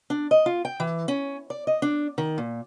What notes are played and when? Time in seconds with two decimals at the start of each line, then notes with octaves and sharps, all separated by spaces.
0.10 D4
0.31 D#5
0.46 F4
0.65 G5
0.80 E3
1.08 C#4
1.50 D5
1.67 D#5
1.82 D4
2.18 D#3
2.38 A#2